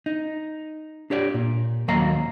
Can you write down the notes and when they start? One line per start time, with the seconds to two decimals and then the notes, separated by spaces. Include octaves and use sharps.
0.06 D#4
1.10 D4 G4 C#5 D5
1.34 A#2
1.88 D#2 F#3 A#3 D#5 F5 A#5